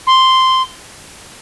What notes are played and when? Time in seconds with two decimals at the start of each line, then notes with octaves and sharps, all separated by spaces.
0.07 C6